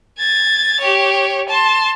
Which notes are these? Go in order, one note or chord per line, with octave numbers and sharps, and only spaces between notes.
G#6 A6
G4 C#5
A5 C6